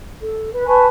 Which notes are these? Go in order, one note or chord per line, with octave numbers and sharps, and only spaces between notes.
A4
B4
B4 G#5 A5 C#6